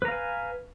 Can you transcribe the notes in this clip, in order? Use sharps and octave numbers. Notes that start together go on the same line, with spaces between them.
B4 F5 G#5 A#5